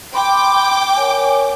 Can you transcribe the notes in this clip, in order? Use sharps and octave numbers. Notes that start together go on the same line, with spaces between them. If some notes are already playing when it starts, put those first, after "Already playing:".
G5 B5 C6 D6
A#4 C#5 G#5